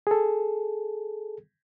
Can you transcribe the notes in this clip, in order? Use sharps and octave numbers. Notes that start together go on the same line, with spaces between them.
G#4 A4